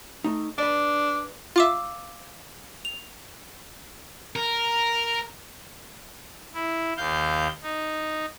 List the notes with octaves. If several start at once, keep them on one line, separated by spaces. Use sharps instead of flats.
A3 D#4
D4 B4 D5
F4 E5 F5 D6 E6
F7
A#4
E4
D#2 F5 G6
D#4